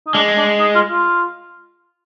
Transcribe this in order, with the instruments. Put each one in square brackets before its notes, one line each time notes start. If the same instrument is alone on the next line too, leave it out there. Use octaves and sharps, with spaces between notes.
[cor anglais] D#4
[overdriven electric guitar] G#3 [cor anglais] D4
[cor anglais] D4
D#4
F4
F4